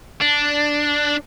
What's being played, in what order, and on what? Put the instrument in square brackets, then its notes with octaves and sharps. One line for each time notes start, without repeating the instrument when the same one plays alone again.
[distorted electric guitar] D4